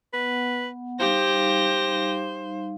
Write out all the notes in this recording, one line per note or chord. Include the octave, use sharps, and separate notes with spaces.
B3 B4 F#5
G3 D#4 G4 C5 F5 A#6